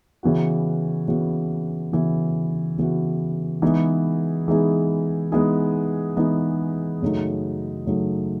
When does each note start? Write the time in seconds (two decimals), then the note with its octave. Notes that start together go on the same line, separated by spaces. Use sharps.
0.23 C#3 E3 B3 F#4
1.08 C#3 E3 B3 F#4
1.93 C#3 E3 B3 F#4
2.78 C#3 E3 B3 F#4
3.62 E3 G#3 B3 D#4 G#4
4.48 E3 G#3 B3 D#4 G#4
5.32 E3 G#3 B3 D#4 G#4
6.17 E3 G#3 B3 D#4 G#4
7.02 F#2 C#3 F#3 A3 D#4
7.86 F#2 C#3 F#3 A3 D#4